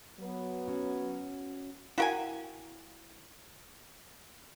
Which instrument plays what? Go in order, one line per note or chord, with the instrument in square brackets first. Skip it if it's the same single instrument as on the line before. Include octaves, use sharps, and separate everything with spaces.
[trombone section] F#3 B3
[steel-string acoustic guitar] C#4 F#4
[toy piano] E4 F5 G5 [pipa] F#4 A#4 G#5